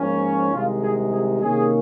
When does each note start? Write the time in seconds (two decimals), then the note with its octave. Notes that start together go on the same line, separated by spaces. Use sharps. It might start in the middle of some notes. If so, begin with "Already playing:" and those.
Already playing: G#2 F3 A#3 C#4
0.53 C2 C3 D#3 G#3 F4
0.83 G#4
1.11 G#4
1.40 C3 D#3 A#3 C#4 G#4